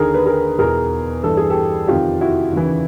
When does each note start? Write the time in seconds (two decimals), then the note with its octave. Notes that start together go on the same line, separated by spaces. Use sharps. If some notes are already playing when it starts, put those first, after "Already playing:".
Already playing: D#2 D3 G#4 A#4
0.14 B4
0.26 G#4 A#4
0.59 E2 B2 G#4 A#4
1.23 G2 E3 A4
1.37 G#4
1.50 G4 A4
1.88 F2 C3 D#3 F4 G4
2.21 E4 F#4
2.53 D#2 C#3 E3